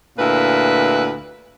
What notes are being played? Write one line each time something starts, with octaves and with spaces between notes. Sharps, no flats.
D2 A#2 E4 B4